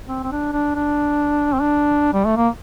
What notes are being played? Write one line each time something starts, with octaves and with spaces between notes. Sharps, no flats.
C4
C4
D4
D4
D4
C4
D4
G3
A3
A#3